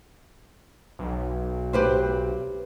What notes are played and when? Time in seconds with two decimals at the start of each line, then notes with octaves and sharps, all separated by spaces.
0.99 B1
1.73 G4 B4 C5